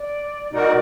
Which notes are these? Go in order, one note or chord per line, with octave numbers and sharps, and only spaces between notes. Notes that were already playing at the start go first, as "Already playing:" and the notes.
Already playing: D5
B2 G#3 D#4 F#4 A#4 D5